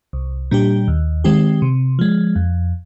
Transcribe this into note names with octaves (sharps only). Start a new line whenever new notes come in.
C2
A#2 G3 D4 G4
D#2
D#3 G#3 C4 G4
C3
F3 G#3
F2